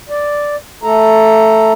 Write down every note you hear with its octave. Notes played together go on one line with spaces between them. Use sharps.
D5
A3 A4 A#5